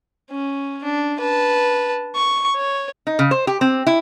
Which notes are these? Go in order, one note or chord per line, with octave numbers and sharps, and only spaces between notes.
C#4
D4
B4 A5
C#6
C#5
D#4
C#3
C5
G4
C4
E4